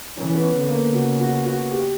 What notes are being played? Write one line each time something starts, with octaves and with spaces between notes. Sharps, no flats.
E3 C#4
B3
C#4
D3
A#3
C#3 F#4
F#4
F#4
G4